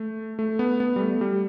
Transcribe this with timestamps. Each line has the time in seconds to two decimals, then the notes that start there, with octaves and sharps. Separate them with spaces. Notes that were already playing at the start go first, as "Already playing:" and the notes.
Already playing: A3
0.39 A3
0.59 B3
0.80 B3
0.96 G3
1.00 A3
1.21 G3